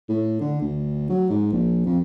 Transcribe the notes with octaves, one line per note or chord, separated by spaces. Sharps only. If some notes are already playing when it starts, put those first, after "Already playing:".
A2
D3
D2
F#3
G#2
A#1
F2